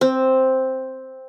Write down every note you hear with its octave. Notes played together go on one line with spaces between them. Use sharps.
C4